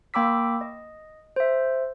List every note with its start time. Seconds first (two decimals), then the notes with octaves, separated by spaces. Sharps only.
0.14 A#3 G5 B5 D6 E6 B6
0.61 D#5
1.36 C5 E5